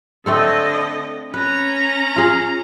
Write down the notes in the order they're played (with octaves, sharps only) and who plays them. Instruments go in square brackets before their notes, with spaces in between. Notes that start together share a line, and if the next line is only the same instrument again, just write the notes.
[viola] D3 D#5 [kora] A3 C4 A4
[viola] C#4 A#5 [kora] B4
[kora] F4 G#4